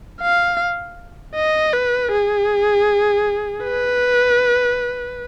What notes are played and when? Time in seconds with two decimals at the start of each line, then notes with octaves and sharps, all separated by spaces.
0.21 F5
1.36 D#5
1.73 B4
2.12 G#4
3.65 B4